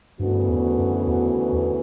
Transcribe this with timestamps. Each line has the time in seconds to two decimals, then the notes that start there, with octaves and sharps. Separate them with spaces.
0.19 D2 G2 C#3 E3 B3 F#4
0.48 E2
0.78 F#2
1.08 E2
1.52 E2